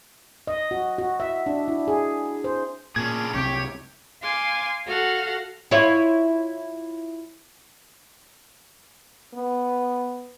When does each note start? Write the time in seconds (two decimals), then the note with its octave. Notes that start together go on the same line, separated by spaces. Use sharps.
0.47 D#5
0.71 F#4
0.98 F#4
1.20 E5
1.46 D4
1.68 E4
1.88 G#4
2.44 C5
2.96 A#2 C#4 D4 G#4 G#6
3.34 C2 F#2 C3 G4 C#5
4.23 F5 G#5 C6 D6
4.86 F#4 A4 F5 F#5
5.71 E4 F4 C#5
9.34 B3